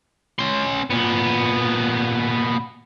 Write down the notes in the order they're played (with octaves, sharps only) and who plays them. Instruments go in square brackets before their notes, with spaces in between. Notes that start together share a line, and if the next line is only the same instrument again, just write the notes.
[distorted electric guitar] C#4 C6
A#2 B3